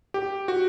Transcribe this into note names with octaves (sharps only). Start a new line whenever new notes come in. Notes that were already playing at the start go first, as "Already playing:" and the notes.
G4
F#4